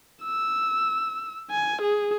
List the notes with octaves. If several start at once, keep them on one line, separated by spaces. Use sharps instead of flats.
E6
G#5
G#4